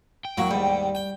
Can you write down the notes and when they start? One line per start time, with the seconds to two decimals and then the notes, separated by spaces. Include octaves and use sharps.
0.25 G5
0.37 E2 F#3 A#3 F#4
0.51 D#2 G#2 G3
0.95 G5